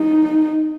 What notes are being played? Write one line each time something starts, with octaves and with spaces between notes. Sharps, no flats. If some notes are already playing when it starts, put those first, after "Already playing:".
Already playing: D#4